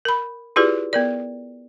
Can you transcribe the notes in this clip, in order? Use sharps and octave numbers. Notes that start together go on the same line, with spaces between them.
A#4 B5
E4 F4 G4 G#4 B4 D5
B3 A#4 D5